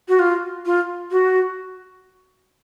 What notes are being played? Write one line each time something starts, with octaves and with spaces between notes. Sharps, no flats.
F#4
F4
F4
F#4